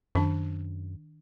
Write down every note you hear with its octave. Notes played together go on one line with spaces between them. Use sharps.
F#2 D#3 D4 A5